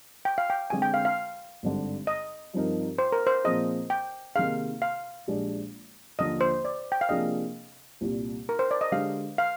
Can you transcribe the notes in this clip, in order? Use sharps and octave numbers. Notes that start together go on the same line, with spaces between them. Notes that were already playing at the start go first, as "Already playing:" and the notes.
G5
F5
G5
D3 G#3 C4 G#5
G5
F5
F5
G#1 G2 D3
D#5
G2 F3 C4 D#4 A#4
C5
A#4
C5
A#2 F3 C4 F4 G#4 D#5
G5
C3 D#3 A#3 D#4 G#4 F5
F5
A#1 A#2 G#3 D4 G4
D#2 D3 F3 D#5
C5
D5
G5
F5
C3 F3 A#3 D4 G#4 D#5
C2 A#2 G3
A#4
C5
D5
D#5
D3 G#3 D4 G4 F5
F5